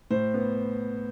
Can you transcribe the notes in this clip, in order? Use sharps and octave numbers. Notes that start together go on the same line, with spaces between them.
A2 C5
B3